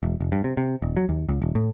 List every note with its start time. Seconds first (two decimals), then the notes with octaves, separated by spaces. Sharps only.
0.03 E1
0.20 F1
0.32 G2
0.44 C3
0.57 C3
0.82 D#1
0.97 F#3
1.09 D#2
1.29 C#2
1.42 D#1
1.55 A2